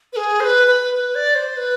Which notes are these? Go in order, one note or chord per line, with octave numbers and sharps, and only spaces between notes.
B4
G#4
C5
B4
B4
B4
D5
C5
B4